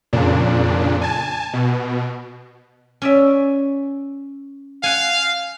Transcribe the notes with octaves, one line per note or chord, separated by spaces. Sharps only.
F2 A#2 C#3 D4
G#5 A5
B2
C#4 D5 E5
F5 F#5 G#5